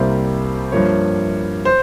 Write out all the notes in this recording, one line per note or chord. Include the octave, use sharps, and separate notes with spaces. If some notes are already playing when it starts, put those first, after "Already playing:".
Already playing: C2 C3 G3 A#3 C5
G2 F3 A#3 C#5
C5